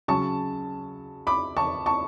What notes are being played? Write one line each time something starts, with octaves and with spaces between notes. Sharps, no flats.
C#3 F#3 A5 C#6
B5 D6
A5 C#6
A5 C#6